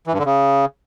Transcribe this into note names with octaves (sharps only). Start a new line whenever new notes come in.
E3
G2
D3
C#3